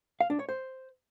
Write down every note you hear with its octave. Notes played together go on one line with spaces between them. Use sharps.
F5
D4
C#5
C5